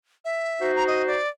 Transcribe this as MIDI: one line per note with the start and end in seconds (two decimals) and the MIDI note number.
0.25 0.72 76
0.60 1.18 63
0.60 1.18 66
0.60 1.18 72
0.76 0.84 82
0.87 1.05 75
1.07 1.28 74